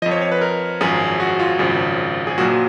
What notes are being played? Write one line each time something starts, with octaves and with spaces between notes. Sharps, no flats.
F2 F3 D#5
C#5
C#5
B4
A#4
G#1 F#2 F3 G#4
F#4
F4
G#1 F#2 C#3 F3
G#4
A#1 A#2 F#3 F#4